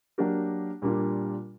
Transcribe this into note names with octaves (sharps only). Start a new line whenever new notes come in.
F#3 A#3 D4 G4 A#4
A#2 G3 A#3 D4 F4